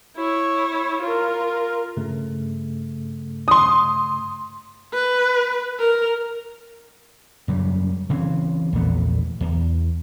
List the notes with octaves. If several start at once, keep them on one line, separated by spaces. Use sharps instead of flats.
E4 C#5
F4 A#4
G2 C#3 A3
C6 D#6
B4
A#4
F#2 C#3 G3
C#3 E3 C4
A#1 E2 A3 B3
E2